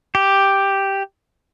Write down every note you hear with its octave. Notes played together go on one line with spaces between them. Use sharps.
G4